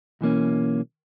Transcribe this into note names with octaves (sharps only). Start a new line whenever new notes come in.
B1 E3 A#3 C#4